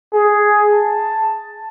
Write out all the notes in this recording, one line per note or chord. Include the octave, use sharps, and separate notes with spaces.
G#4
A5